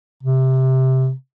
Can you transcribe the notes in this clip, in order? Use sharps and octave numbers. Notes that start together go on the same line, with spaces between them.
C3